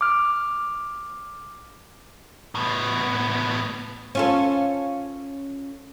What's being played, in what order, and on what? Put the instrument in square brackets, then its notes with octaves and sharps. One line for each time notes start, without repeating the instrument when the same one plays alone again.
[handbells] D6 F6
[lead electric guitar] A2 B3
[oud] C#4 F4 A4